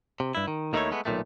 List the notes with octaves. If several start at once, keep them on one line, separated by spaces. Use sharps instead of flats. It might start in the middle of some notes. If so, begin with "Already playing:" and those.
C3
G2 E4
D#3
D#2 D#3 A3 D#4 E4 C#5
G#3 A3 B3
B1 E2 A#2 D#3 A3